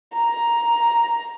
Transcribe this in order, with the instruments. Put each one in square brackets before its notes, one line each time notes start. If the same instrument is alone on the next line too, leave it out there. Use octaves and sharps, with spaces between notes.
[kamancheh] A#5